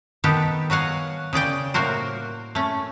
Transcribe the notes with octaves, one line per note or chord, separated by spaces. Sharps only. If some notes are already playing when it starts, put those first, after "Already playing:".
D#3 B3 G4 A4
F#3 F#4 F5 F#5 G#5
C#3 G#4 D5 G5
A2 A#3 F#4 A#4 C5
A3 C#4